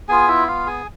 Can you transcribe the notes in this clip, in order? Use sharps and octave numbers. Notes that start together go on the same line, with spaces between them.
B3 F4 G#4 G#5
E4 E5
F4 F5
G#4 G#5